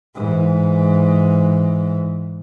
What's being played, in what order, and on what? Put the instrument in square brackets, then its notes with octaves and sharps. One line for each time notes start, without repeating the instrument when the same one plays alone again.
[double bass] G#2 E3